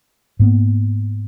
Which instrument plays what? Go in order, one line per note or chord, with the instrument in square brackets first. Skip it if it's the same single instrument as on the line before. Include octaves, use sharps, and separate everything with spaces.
[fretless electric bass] G#2 A#3 B3